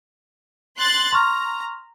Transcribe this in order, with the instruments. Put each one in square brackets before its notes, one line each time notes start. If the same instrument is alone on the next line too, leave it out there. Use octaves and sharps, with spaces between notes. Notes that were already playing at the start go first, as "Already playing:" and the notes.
[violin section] C6 F#6 A6
[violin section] A#5 [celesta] C6 C#6 F6